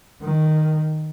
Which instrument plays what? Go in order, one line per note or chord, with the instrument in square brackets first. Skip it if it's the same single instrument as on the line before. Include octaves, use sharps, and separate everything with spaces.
[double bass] D#3